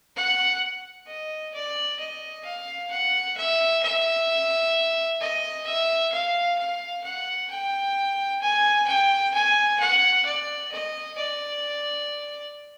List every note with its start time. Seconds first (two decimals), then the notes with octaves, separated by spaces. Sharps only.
0.16 F#5
1.07 D#5
1.54 D5
1.99 D#5
2.45 F5
2.91 F#5
3.37 E5
3.83 E5
5.21 D#5
5.66 E5
6.12 F5
6.58 F5
7.04 F#5
7.51 G5
8.42 G#5
8.88 G5
9.34 G#5
9.80 F#5
10.25 D5
10.72 D#5
11.18 D5